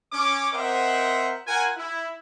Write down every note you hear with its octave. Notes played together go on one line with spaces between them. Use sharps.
C#4 D6
C4 A#4 C5 D#5 E5 F#5
F4 A#4 F#5 G#5
E4